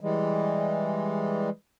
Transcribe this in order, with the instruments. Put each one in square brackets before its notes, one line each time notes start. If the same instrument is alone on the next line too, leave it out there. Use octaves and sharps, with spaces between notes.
[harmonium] E3 G3 G#3